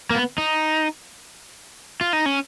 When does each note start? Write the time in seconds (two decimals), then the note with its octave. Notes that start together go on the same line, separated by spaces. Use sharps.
0.10 A#3
0.15 B3
0.38 D#4
2.01 F4
2.13 D#4
2.26 C#4